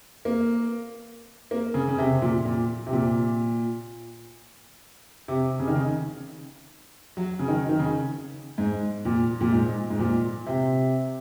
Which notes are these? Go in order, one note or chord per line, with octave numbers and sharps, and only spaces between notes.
A#3
A#3
C#3
C#3
C3
A#2
A#2
C3
A#2
C3
C#3
D#3
C#3
F#3
C#3
D#3
D#3
C#3
G#2
A#2
A#2
G#2
G#2
A#2
C3